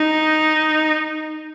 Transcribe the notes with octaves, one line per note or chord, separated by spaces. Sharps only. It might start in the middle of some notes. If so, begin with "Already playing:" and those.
Already playing: D#4